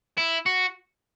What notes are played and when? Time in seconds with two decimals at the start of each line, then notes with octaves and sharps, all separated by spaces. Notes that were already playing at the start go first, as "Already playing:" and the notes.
0.18 E4
0.46 F#4